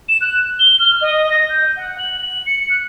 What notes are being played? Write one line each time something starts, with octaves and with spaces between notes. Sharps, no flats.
E7
F#6
G7
F6
D#5
A#6
G6
F#5
F#7
F#7
C#7
F#6